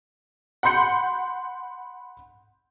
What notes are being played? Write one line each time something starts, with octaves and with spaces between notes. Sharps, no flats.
F#5 B5 C6 G6 C#7